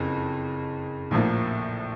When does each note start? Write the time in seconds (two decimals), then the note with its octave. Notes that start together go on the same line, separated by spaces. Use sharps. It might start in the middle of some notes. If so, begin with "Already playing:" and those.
Already playing: F#1 F2 C#3
1.11 A#1 A2 F3 A#3